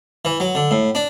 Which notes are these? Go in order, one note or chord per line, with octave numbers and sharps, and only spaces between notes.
E3
F#3
D3
A2
D4